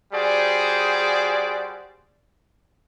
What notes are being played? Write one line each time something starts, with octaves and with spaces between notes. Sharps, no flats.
G3 F#4 G#4 C5 D5